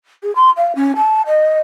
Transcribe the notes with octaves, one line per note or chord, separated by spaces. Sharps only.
G#4
C6
F5
C#4
A5
D#5